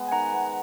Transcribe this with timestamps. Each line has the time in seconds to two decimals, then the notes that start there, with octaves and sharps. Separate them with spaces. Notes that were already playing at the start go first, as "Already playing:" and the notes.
Already playing: G#3 B3
0.08 G#5
0.12 D#3 F#5 A#5
0.33 B3